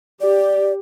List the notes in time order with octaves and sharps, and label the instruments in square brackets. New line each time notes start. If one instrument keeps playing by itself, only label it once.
[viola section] G4 [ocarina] D5